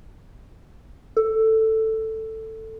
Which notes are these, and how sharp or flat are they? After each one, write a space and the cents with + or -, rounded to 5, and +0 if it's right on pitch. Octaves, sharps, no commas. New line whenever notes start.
A4 +10